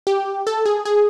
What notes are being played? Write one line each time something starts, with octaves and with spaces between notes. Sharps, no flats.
G4
A4
G#4
G#4